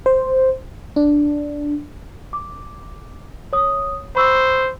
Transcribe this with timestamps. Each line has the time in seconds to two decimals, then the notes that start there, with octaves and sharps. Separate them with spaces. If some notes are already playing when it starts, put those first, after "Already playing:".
0.06 C5
0.96 D4
2.33 D6
3.53 C#5 D#6
4.16 C5 B5 C#6 E6